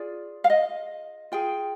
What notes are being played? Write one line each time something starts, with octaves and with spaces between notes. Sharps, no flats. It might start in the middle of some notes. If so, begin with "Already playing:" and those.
Already playing: F4 G#4 D5
F5
D#5
F4 G#4 G5